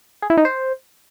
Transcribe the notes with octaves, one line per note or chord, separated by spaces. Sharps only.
G#4
E4
D#4
C5